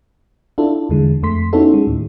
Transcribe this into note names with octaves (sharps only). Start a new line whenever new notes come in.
D4 E4 F4 A4
E2 D3 G#3
F2 A3 C6 B6
B3 C#4 D#4 E4 F#4 A4
G#3
D#2 A2